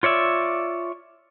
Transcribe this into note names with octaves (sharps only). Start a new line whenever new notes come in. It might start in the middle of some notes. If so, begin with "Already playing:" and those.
F4 C#5 D5 E5